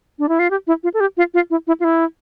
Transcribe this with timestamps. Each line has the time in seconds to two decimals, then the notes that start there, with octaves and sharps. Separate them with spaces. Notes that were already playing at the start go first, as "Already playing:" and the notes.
0.19 D4
0.29 E4
0.39 F4
0.50 G4
0.67 E4
0.83 F4
0.94 A4
1.00 G4
1.17 F4
1.34 F4
1.50 E4
1.67 E4
1.80 F4
1.84 E4